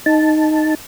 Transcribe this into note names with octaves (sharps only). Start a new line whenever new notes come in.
D#4 A5